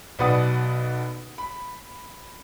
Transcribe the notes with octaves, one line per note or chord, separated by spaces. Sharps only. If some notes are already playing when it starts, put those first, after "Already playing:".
B1 B2 B4 D5 F#5 D#6
B5